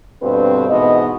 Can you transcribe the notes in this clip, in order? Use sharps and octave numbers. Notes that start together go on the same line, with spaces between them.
G2 B2 D3 C4 B4 C5
G#2 B2 E3 B3 D#5